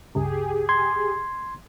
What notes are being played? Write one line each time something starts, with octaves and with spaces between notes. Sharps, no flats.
C#2 G2 C#3 G4 G#4
C6 G#6